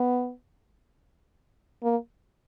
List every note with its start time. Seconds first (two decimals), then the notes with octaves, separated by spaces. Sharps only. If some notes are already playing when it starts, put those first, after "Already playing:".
Already playing: B3
1.83 A#3